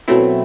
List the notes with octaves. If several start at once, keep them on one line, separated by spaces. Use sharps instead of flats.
B2 F#3 A3 C4 E4